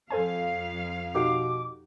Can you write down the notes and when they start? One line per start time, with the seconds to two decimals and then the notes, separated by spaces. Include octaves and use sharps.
0.10 F2 A4 C5 F5 G#5
1.15 B2 D#4 F#4 G4 D6